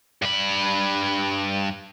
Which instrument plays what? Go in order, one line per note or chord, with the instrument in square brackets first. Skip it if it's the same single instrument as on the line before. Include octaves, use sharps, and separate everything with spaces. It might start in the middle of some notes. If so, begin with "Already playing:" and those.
[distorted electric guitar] G2 B5